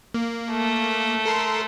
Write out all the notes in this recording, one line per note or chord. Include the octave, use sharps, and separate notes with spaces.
A#3
A3
A4 A#4 C6